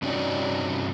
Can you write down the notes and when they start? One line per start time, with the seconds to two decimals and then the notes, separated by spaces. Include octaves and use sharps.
0.02 G2 C3 C#4 D#4 F#4 D5